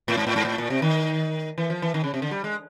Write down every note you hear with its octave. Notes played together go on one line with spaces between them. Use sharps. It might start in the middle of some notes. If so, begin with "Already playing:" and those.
A2
G#2
A2
G#2
A2
A#2
C3
D#3
E3
F3
E3
D#3
C#3
C3
D3
G3
G#3